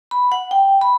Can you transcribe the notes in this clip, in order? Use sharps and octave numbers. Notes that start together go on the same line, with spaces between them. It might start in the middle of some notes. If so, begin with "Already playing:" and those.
B5
F#5
G5
B5